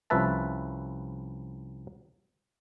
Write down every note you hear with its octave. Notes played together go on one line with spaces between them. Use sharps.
C2 F3 C#4 B4 E5 A5